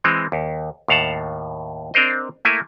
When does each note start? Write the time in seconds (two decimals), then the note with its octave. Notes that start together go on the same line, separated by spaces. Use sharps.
0.04 E3 G#3 C4
0.32 D#2
0.88 D#2 A2 F5 F#5 A5
1.94 C4 D4 A#4 C5 D#5
2.45 A3 A#3 E4 G#5